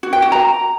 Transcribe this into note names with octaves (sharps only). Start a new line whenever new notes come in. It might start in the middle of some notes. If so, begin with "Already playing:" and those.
F#4
G5
F#4
A#5